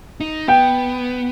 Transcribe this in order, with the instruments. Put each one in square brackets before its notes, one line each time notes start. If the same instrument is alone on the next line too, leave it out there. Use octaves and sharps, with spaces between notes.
[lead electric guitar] D#4
[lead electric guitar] B3 [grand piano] G5